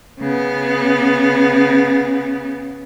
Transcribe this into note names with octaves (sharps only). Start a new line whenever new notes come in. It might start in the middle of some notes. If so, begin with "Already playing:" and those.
C#3 B3